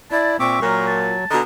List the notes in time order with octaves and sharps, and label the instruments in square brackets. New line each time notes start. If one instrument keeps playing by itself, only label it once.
[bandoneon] E4 [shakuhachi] D5 [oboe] A5
[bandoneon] A#2 C4 D6 [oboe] E5 [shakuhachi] C#6
[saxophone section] A#2 [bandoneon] F#3 [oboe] A#4
[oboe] A5
[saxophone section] B2 D3 D#5 [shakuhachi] A#5